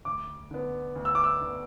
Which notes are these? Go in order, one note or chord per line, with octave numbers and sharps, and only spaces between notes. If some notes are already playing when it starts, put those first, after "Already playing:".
D2 D6
D3 B3
D2
E6
D6
E6
D3 B3